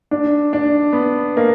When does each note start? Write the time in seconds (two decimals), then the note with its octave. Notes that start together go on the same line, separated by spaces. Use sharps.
0.11 D4
0.53 D4
0.93 B3
1.37 A#3